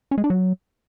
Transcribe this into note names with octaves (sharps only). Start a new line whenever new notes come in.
C#4
G#3
D4
F#3